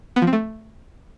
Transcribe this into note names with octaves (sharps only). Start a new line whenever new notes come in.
B3
F3
C4
A3